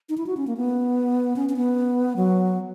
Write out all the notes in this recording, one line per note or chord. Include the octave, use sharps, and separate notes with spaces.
D#4
E4
F#4
C#4
A#3
B3
C#4
C#4
B3
F#3